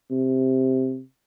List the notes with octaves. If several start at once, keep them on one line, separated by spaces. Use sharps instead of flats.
C3